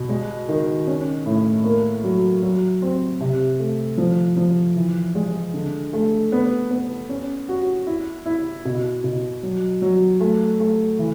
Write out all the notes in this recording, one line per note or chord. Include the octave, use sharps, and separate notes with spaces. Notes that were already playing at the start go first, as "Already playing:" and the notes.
Already playing: B2
G#3
D#3
C#4
A2
A#3
F#3
F#3
C4
C3
A3
F3
F3
E3
G#3
D3
A3
B3
B3
C#4
F#4
E4
E4
B2
B2
F#3
F#3
A3
A3
E3